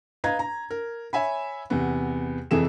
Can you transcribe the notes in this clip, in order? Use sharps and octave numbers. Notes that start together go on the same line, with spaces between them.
B4 D#5 F5 A#5 G#6
A#5
A#4
C#5 E5 G#5 B5
E2 C3 B3
F1 F2 E3 G#4 A4 E7